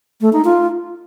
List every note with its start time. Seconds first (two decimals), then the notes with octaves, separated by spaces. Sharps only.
0.21 A3
0.33 D#4
0.45 F4